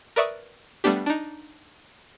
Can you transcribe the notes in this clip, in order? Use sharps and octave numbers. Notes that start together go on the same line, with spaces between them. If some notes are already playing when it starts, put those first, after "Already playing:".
A#4 B4 D5 E5 C#6 D#6
G3 A3 B3 D4 G4
D4 D#4